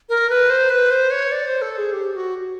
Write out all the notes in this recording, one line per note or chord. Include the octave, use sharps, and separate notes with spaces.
A#4
B4
C5
B4
C5
C#5
D5
C5
A4
G#4
G4
G4
F#4